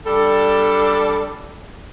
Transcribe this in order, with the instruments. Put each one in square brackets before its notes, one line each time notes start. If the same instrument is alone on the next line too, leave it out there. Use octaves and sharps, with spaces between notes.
[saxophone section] G3 D4 A4